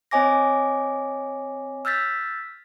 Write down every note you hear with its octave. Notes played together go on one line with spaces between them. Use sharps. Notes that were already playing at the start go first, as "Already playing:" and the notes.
C4 C#5 D#5 G#5 D6 A#6
E6 F6 G6 A6 B6